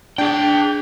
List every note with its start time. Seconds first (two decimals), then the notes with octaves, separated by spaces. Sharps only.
0.18 D4 G#4 G5 G6